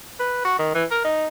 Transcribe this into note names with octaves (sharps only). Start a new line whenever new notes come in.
B4
F#4
D#3
E3
A#4
D#4